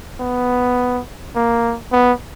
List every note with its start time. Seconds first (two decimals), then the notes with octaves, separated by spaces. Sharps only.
0.21 B3
1.36 A#3
1.92 B3